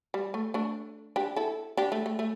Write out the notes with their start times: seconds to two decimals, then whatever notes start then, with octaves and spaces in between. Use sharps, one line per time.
0.14 G3
0.34 A3
0.54 A3 D4
1.16 D4 G4
1.36 E4 A4
1.77 D4 G4
1.92 A3
2.06 A3
2.19 A3